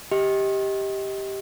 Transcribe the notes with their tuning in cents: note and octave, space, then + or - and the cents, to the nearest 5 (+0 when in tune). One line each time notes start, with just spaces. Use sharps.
G4 +0 D#5 +25